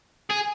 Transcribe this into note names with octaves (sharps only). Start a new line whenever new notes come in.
G#4